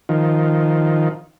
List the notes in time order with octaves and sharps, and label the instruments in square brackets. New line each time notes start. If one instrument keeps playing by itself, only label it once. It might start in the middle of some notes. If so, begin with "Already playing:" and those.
[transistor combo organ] D#3 F3